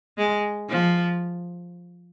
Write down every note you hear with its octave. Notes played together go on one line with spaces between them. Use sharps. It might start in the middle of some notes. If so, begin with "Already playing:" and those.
G#3
F3